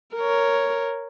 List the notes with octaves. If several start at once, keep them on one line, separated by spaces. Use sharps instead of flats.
A#4 C#5